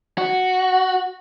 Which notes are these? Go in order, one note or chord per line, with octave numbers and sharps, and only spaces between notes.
F#4